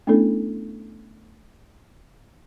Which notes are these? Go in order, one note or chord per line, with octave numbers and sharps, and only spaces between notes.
A3 B3 C#4 D4 E4 A4